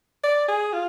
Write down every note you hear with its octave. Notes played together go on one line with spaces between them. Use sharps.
D5
G#4
F4